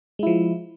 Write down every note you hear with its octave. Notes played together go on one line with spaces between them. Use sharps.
F3 G#3 E4